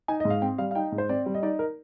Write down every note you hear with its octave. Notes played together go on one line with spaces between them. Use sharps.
D#4 G#5
G#2 D#5
F5
C4 G5
G3 F5
F5
D#4 G5
G#2
C5
C4 D5
G3
D#5
D#4 D5
A#4